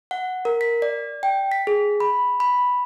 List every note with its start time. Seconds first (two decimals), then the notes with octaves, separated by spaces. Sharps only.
0.11 F#5
0.45 A#4
0.61 B6
0.82 D5
1.23 G5
1.52 B6
1.67 G#4
2.00 B5
2.40 B5